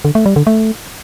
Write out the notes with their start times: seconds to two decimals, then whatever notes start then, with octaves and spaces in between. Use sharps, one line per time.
0.05 D3
0.15 A3
0.26 G3
0.36 D3
0.47 A3